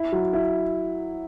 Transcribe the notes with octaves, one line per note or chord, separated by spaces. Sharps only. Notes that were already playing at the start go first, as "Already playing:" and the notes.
Already playing: E4
F#3
E4